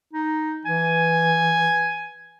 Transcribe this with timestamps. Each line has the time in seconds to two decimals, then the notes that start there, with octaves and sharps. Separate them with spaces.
0.14 D#4
0.65 E3 G#5